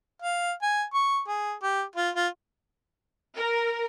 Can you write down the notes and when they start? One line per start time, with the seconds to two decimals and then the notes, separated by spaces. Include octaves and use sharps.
0.22 F5
0.62 G#5
0.94 C#6
1.28 G#4
1.63 G4
1.96 F4
2.15 F4
3.36 A#4